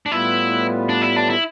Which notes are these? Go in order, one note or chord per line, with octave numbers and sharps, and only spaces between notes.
D4
A2 G3 B3 E4 F4 B4
D4
E4
D4
E4